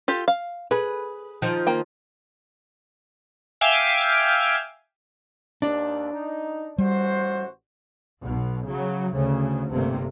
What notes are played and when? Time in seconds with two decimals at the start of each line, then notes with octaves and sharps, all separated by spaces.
0.08 F4 G4 A4
0.28 F5
0.71 G#4 B4
1.42 D#3 F3
1.67 A#3 G5
3.61 E5 F5 G5 G#5 D6
5.62 D#2 D4
6.12 D#4
6.78 A1 G3 F#4 C5
8.22 B1 B2
8.66 C#3 F#3
9.14 D2 C#3
9.70 G1 G2 C3 A3 A#3